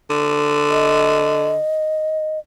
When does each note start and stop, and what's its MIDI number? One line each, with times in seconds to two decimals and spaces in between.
0.10 1.58 50
0.71 2.39 75